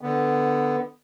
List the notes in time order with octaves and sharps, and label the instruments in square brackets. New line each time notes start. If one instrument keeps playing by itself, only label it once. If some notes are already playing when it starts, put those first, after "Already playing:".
[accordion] D3 B3